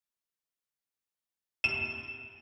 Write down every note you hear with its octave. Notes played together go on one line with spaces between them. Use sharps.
E7